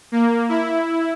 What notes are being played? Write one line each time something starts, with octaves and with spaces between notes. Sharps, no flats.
A#3
E4